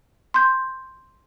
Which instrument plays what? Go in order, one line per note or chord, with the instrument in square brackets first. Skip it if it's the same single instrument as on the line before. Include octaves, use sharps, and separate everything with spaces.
[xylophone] C6 G6